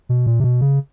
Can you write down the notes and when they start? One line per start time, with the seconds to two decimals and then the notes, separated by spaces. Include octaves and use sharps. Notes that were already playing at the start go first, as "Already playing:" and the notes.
0.09 B2
0.27 A#2
0.40 C3
0.44 B2
0.61 C#3